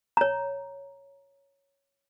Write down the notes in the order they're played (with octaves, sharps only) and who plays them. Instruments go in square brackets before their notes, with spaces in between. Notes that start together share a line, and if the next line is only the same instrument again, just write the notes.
[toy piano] C#5 A#5